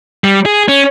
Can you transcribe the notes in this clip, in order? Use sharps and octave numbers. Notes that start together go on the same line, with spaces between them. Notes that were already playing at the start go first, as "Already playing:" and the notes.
G3
G#4
C#4